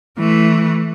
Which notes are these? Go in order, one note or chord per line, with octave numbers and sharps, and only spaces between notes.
E3 A3